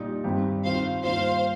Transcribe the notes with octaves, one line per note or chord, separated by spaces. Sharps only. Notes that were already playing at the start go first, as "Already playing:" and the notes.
Already playing: A#2 G3 D#4
G2 D#3 C4 G4
D#3 C4 F4 C5 F5
G2 D#3 A#3 F4 C5 F5